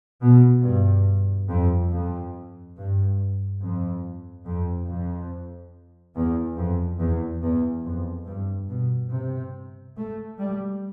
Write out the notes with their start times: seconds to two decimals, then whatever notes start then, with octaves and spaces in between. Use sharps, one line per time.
0.22 B2
0.64 G2
1.49 F2
1.91 F2
2.76 G2
3.60 F2
4.45 F2
4.87 F2
6.15 E2
6.57 F2
6.99 E2
7.42 E2
7.84 F2
8.26 G2
8.69 B2
9.11 C3
9.96 A3
10.38 G3